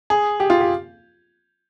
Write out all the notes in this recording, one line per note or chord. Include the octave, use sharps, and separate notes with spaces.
G#4
G4
F4
G4